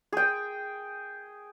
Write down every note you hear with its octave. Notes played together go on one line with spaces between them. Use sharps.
G#4 G5